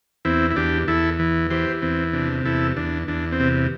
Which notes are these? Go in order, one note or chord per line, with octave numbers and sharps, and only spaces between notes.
E2 C4 E4
E4
E2 D4 G4
E2 E4 A4
E3
E3 G4 C5
E2 C4
C3 D4
E2 E4 A4
E2 D4
E2 D4
C4
C3